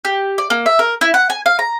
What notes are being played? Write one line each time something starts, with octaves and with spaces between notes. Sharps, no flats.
G4
D5
A#3
E5
A#4
E4
F#5
G#5
F5
A#5